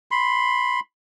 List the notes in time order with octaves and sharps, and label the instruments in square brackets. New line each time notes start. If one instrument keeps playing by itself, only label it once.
[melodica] B5 C6